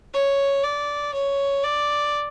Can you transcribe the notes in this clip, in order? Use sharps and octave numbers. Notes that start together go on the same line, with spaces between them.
C#5
D5
C#5
D5